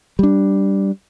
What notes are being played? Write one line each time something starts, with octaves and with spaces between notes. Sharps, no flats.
G3 D4